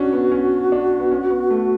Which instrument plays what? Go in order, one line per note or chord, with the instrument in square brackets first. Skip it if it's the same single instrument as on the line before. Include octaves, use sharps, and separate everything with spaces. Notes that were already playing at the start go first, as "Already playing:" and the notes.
Already playing: [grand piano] C#4 D4 [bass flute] F#4
[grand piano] B3
C#4
D4
B3
C#4
B3
A3